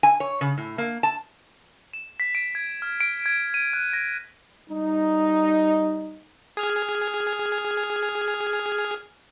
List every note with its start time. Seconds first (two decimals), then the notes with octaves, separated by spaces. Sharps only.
0.03 G#5
0.20 C#5
0.41 C#3
0.58 A2
0.78 A#3
1.03 A5
1.93 E7
2.20 B6
2.35 D7
2.55 G#6
2.82 F6
3.00 D7
3.26 G#6
3.54 D#7
3.73 F#6
3.93 A#6
4.69 G3 D#4
6.57 G#4 F6 G#6